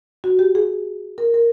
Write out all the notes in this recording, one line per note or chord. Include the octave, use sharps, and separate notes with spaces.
F#4
G4
G#4
A#4
A#4